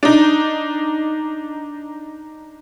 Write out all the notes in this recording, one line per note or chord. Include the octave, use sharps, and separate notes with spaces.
D4 D#4